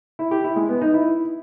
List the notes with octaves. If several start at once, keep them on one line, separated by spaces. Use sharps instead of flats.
E4
G4
E4
G#3
B3
D#4
E4